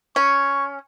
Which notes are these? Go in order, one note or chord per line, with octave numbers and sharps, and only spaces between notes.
C#4 C#6